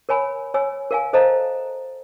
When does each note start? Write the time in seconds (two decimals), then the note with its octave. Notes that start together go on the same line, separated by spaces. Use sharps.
0.09 A#4 C#5 G#5 B5
0.54 C#5 G#5 E6
0.91 A#4 F5 G#5
1.13 A4 C5 D#5 F5 A5 A#5